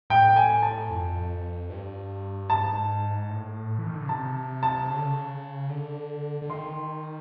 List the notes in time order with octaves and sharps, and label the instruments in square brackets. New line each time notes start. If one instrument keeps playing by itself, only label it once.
[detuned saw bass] A2 [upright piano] G5
[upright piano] G#5
A5
[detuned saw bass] F2
G2
[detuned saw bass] G#2 [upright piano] A5
[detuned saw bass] A2
E3
D#3
D3
C#3
[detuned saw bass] C3 [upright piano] A5
[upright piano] A5
[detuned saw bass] C#3
D3
C#3
D3
D3
[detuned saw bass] D#3 [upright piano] C6